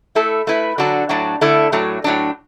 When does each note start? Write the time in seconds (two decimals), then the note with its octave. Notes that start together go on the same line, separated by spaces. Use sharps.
0.15 A3 E4 A4
0.47 A3 E4 B4
0.78 D3 F#3 D4 F#4 A4
1.09 A2 F#3 D4 F#4
1.41 D3 A3 E4
1.72 A2 F#3 A3 D4
2.04 A2 F#3 D4